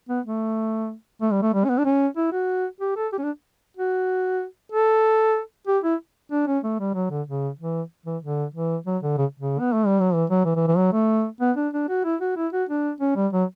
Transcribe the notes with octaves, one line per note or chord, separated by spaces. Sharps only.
B3
A3
A3
G3
A3
G3
C#4
B3
D4
C#4
E4
F#4
G4
A4
G4
C#4
D4
F#4
A4
G4
E4
D4
C#4
A3
G3
F#3
D3
C#3
E3
E3
D3
E3
F#3
D3
C#3
C#3
B3
A3
G3
F#3
E3
F#3
E3
E3
E3
F#3
A3
B3
D4
D4
F#4
E4
F#4
E4
F#4
D4
C#4
G3
F#3